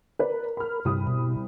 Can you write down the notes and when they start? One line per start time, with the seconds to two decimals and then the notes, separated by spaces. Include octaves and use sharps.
0.19 A#4 B4 D5
0.57 B5 F6
0.85 C2 G2 B5 D#6
1.07 B2